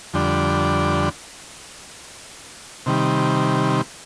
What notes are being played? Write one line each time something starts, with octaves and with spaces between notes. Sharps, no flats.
F2 D3 G3 D4
C3 D#3 G3